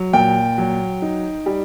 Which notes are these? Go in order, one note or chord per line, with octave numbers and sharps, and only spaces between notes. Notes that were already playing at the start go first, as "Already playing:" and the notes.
Already playing: F#3
A#2 G5
F#3
D#4
G3